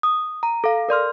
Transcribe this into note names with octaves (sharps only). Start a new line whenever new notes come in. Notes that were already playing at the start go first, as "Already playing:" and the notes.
D#6
A#5
A4 F5
A#4 D5 C6 F6